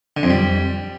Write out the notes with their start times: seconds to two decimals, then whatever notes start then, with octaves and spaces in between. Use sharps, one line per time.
0.17 D3
0.23 F2
0.30 G3